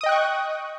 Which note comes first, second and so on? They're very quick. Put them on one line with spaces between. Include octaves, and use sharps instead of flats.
D#6 D#5 G5 F#6 C#6